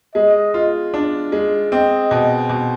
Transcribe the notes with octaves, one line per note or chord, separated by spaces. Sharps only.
G#3 D#5
F4
D4
G#3
C4 D#5
B2
B2